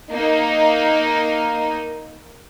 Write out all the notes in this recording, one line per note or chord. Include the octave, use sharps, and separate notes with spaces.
A#3 D#4